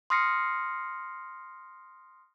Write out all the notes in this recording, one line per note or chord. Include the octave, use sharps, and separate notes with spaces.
C6 D#6 F6 A#6 C7 C#7